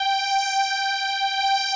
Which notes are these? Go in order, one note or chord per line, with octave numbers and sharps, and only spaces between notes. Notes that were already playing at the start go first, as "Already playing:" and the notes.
Already playing: G5
G5